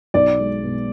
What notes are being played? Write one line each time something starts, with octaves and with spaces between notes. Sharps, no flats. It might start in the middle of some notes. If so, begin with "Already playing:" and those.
B1 D5
G#3
B2